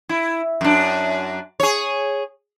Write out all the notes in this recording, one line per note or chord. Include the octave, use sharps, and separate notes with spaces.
E4
F#2 D4
G#4 C#5